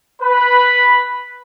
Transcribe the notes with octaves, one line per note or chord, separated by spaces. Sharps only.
B4 B5